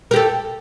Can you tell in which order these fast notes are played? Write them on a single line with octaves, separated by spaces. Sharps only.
A#4 G4 A4